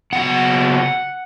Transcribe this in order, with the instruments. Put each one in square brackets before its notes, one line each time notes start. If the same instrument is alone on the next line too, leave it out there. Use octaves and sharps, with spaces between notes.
[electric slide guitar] C#3 F#3 B3 F#5